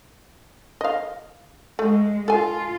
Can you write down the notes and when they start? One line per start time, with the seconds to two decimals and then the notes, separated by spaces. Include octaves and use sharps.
0.81 D#5 F5
1.79 G#3 A3
2.28 F4 A4 G#5